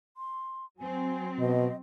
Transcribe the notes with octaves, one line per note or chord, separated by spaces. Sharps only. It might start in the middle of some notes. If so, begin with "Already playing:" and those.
C6
F#3 C4 G#5
B2 D#5